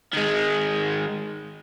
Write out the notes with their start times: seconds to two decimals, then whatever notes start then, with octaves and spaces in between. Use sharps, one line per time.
0.13 D#3 G#3